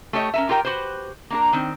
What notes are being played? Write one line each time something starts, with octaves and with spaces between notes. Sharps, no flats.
A3 G4 C#5 D#5
C#4 A#4 E5
F4 G4 A#4 G5
F#4 G4 B4 C5
A#3 D4 A#4
D#3 C4